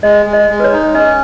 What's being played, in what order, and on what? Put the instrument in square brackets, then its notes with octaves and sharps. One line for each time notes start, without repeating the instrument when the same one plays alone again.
[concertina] G#3 [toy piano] D#5
[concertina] G#3
[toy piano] D#5
[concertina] G#3
[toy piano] B4
C#5
[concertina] D#4
[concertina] C#4 [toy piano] D#5